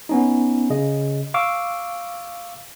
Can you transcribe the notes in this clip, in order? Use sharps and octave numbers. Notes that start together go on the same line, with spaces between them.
B3 C#4 D#4
C#3 D#5
F5 C#6 D6 E6